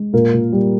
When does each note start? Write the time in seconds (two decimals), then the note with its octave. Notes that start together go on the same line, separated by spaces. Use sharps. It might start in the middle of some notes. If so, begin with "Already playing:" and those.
Already playing: G#3
0.13 A#2 A#3 A#4
0.34 A#2
0.52 G3